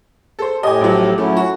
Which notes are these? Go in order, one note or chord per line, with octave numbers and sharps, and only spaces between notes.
A4 C5
A2 G4 D#5 G#5
A1 F3 F#3
F#3 A3 C#4 E4
F#4